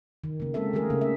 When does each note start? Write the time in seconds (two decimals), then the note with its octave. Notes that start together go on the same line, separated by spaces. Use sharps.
0.24 D#3
0.40 C#3 A#3
0.54 G#3 A#3 C4 A4 E5
0.73 D#3 G3 A3 G#4 A#4
0.90 C#3 A#3
1.01 E5